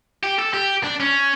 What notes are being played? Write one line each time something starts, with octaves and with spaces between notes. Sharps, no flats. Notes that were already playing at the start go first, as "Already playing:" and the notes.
G4
A4
G4
D4
C#4